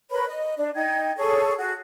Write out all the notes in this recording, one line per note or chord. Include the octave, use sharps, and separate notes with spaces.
A#4 B4 C#5 B5
D#5
D4 D5
D#4 G5 G#6
G#4 A4 C#5 C#6
F#4 G#4